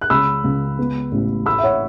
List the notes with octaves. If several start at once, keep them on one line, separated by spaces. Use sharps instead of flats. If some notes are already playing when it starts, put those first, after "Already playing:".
F#6
C#2 B5 E6
C#2
B3
A1
A3 B5 E6
E5
C#5 F#5